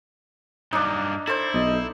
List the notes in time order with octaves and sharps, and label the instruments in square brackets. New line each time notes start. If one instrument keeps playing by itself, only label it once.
[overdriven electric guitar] G2 F#3 [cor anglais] A#3 [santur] D4 D#4
[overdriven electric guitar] E4 [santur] A4 C5
[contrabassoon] B1 [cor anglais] D#5